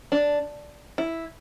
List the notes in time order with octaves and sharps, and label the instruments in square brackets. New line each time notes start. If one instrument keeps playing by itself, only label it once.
[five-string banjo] D4
E4